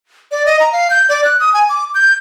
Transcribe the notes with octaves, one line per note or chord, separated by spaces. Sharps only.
D5
D#5
A#5
F5
G6
D5
F#6
D#6
G#5
D6
G6